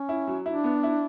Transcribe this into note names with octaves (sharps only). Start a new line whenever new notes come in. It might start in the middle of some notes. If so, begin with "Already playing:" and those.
Already playing: C#4
E4
F#3
D4 E4
B3
E4